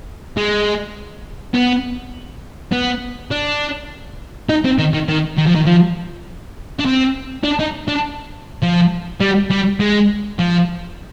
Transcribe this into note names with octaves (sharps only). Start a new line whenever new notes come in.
G#3
B3
B3
D4
D#4
C4
D#3
D#3
D#3
D#3
F3
D#3
F3
D4
C4
D4
D#4
D4
F3
G3
G3
G#3
F3